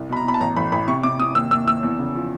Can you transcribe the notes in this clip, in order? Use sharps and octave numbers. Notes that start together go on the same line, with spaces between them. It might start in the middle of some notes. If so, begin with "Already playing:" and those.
Already playing: C2
B2 B5
A#5
B2 B5
A5
A1 A#5
A1 B5
A1 B5
C3 C#6
C3 D6
C3 D#6
D#2 E6
D#2 E6
D#2 E6
E2
C#3
F3